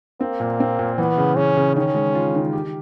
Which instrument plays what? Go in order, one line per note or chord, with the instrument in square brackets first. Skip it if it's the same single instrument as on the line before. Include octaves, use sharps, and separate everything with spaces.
[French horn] A#3 [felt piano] C4
[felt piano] A#2
C4
A#2
[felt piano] E3 [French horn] B3
[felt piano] C#3
[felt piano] C#3 [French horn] C#4
[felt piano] C#3
[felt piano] D#3 [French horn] C#4
[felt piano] G#3
F4
D#3
G4